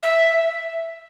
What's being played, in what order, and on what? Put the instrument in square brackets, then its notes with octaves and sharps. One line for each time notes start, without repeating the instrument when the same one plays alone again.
[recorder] E5